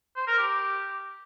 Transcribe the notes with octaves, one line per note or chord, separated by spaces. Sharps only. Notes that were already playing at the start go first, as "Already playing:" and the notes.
C5
A#4
G4